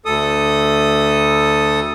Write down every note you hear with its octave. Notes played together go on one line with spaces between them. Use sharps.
D2 A4 D#6